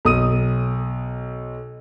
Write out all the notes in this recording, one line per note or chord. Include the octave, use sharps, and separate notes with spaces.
B1 D#6 D#7